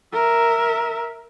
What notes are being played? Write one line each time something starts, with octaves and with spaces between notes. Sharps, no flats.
A#4 E5